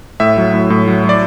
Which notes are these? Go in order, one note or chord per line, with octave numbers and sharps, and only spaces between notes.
A2 E5
F#3
A2
A2
F#3
F#3
D5